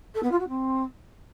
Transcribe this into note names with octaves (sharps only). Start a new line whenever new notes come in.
A4
B3
F4
F#4
C4